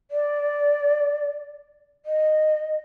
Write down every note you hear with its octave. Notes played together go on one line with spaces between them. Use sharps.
D5
D#5